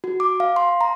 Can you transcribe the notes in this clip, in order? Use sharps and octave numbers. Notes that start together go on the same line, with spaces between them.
F#4
D6
F5
C6
A#5